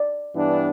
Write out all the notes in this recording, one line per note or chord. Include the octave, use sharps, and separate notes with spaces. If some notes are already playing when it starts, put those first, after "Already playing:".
Already playing: D5
G2 E3 B3 D4